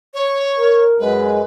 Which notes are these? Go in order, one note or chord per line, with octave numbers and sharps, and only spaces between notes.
C#5
A#4
F#2 G#3 B4